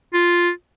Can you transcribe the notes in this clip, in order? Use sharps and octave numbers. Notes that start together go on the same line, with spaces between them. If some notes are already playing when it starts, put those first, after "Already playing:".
F4